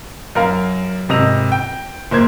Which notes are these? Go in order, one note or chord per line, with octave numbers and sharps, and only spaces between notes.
F#2 A#4 F5
G#1 C3 D#5 A#6 F7
G5
F#1 A#3 C5 G#6